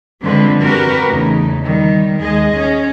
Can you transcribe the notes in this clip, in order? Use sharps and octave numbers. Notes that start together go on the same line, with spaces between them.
D3 F3 G3 G#3 C4 B4
C4 F#4 G4 A#4 B4
E2 C#3 A3 D#4
D#3 G3
D#2 G#3 G#4 D#5
C#4